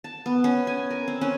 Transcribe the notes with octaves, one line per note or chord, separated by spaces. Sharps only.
A5
B3
C#4
G#5
A#4
C4
C#4